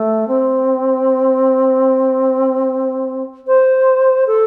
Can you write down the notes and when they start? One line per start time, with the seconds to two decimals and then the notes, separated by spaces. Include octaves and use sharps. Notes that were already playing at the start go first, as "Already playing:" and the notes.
Already playing: A3
0.27 C4
3.47 C5
4.27 A4